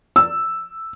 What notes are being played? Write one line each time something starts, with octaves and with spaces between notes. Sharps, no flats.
E6